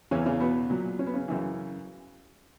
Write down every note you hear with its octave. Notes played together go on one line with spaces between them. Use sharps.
E2 C#3 E3 C#4
C#3 C#4
B2 B3
A#2 F#3
C#4
B3
C#3 C#4
F#2 C#3 E3